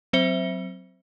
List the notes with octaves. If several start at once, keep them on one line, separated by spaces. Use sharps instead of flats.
F#3 C4 C5 E5 C#7 G7